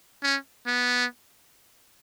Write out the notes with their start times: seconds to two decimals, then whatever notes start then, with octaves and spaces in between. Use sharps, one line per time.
0.23 C#4
0.66 B3